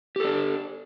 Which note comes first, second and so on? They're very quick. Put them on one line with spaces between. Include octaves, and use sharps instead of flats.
G4 A4 D4